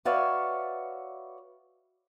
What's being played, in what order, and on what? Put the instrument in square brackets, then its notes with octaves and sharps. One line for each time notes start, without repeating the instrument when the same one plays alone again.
[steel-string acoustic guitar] F#4 B4 C#5 D5 E5 F5